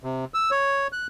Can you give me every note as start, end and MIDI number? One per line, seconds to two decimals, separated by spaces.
0.04 0.25 48
0.34 0.51 88
0.51 0.87 73
0.93 1.07 90